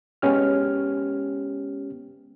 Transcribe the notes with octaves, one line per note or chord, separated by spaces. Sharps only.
G#3 B3 C#4 G4 F6